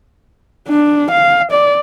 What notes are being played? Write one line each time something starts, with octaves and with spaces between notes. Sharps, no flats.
D4
F5
D5